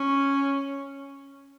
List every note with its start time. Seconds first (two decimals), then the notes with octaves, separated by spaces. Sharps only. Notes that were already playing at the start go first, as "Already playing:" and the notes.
Already playing: C#4